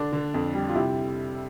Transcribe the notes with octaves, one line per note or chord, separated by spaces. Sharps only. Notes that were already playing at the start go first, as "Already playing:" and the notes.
Already playing: D3 D4
D3
F2
G3
F4
C3 E4